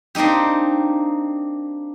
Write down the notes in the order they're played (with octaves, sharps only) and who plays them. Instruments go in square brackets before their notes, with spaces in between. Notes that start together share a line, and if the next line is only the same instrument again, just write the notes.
[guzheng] A#3 C4 D4 D#4 G4